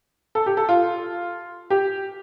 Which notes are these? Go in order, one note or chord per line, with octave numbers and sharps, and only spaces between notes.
A4
G4
A4
F4
G4